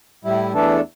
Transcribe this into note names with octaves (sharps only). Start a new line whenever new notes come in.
A2 G3 E4
E2 E3 A3 D4 A4